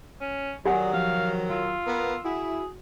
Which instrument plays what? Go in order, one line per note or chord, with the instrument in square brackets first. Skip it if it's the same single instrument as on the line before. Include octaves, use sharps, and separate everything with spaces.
[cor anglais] C#4
[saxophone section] D#3 F#3 [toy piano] G4 F#5 G#5 [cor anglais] G#4 [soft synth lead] D5
[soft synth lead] F3 [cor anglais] F5
[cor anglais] F4 [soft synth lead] E6
[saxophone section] B3 A#4
[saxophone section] E4 [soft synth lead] F#4 [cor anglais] G#4